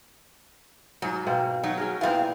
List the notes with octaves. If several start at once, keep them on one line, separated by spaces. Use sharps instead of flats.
G#2 F#3 F#4
B2 A#3 C4
F#3 D#4
C#4 G#4 A#4
A#2 E3 B3 C4 F5